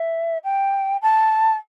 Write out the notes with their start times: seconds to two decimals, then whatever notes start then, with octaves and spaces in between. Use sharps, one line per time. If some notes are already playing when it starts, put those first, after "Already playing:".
Already playing: E5
0.43 G5
1.02 A5